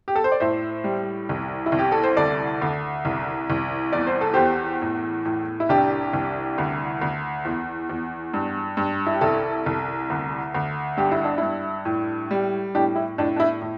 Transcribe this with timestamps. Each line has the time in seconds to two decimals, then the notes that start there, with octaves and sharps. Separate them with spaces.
0.08 G4
0.16 A4
0.24 C5
0.32 D5
0.40 A2 C5 E5
0.84 G3
1.29 C2
1.66 E4
1.72 C2
1.79 G4
1.92 A4
2.03 C5
2.17 D2 A4 D5
2.62 D2
3.05 C2
3.50 C2
3.92 E2 D5
4.07 C5
4.21 A4
4.34 E2 G4 C5
4.82 A2
5.25 A2
5.60 E4
5.69 C2 D4 G4
6.13 C2
6.58 D2
7.01 D2
7.45 E2
7.90 E2
8.34 G2
8.77 G2
9.06 E4
9.14 G4
9.21 C2 E4 A4
9.66 C2
10.10 D2
10.55 D2
10.97 G2 G4
11.11 E4
11.24 D4
11.38 G2 E4
11.85 A2
12.31 G3
12.75 A2 D4 G4
12.96 E4
13.18 A2 D4
13.36 D4
13.40 E4
13.62 A2